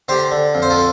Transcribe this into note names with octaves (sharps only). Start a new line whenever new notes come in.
D3 G4 C5
D3
F2
C5
F4 A4